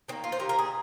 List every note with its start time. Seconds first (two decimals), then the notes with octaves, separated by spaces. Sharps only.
0.08 D#3 C4
0.12 A#3
0.24 F4
0.32 C5
0.39 D#3 G3 A#3 A#4
0.49 A#4
0.59 G#4